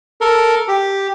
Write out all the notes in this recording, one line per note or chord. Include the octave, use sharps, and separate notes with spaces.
A4 A#4
G4